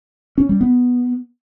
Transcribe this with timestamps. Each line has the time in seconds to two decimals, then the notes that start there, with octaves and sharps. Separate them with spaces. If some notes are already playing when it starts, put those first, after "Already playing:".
0.38 C#4
0.49 G3
0.61 B3